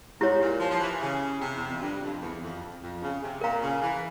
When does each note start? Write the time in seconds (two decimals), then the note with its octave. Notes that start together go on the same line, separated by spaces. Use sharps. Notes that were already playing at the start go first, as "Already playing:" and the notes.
0.20 G#2 E4 G4 C#5
0.40 A#2
0.60 F3
0.71 F3
0.80 E3
1.01 C#3
1.41 C3
1.56 E2
1.69 F2
1.81 G2
2.02 F2
2.22 E2
2.41 F2
2.82 F2
3.02 C#3
3.22 C3
3.41 A#2 A#4 F5 A#5
3.62 C#3
3.82 E3